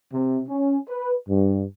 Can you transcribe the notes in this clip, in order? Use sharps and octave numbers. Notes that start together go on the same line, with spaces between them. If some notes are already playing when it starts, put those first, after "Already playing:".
C3
C#4
B4
G2